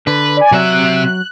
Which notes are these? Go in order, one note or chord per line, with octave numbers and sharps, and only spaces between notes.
D3 B4
D5 G#5
C3 F#3 E5 F#6